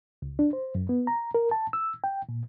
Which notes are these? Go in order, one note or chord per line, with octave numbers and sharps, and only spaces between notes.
C#2
D4
C5
F#2
B3
A#5
A#4
A5
E6
G5
A#2